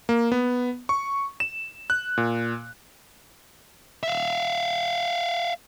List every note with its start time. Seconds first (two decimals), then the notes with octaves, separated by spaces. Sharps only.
0.09 A#3
0.32 B3
0.89 C#6
1.40 E7
1.90 F#6
2.17 A#2
4.03 E5 F5